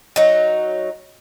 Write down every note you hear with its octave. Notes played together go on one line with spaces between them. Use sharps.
F#3 D#4